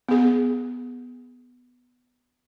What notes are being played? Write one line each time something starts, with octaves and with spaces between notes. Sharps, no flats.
B3 G#4